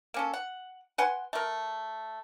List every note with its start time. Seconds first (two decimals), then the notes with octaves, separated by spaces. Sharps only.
0.14 A#3 C#4 A4
0.34 F#5
0.98 B4 F#5 G#5 C6
1.33 A3 A#4